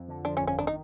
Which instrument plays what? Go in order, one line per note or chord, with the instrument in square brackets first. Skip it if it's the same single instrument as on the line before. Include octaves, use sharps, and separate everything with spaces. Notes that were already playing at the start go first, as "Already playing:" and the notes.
Already playing: [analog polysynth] F2
D3
[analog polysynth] F3 [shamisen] D4
[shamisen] C#4
[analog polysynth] G1
[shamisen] C#4
[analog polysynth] D#3 [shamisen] D4
[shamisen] D#4